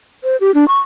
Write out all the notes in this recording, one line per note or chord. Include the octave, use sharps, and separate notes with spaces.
C5
G4
D4
C#6